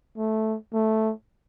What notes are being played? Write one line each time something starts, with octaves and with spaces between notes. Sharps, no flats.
A3
A3